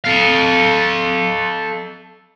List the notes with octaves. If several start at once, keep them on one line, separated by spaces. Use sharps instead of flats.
A4 F5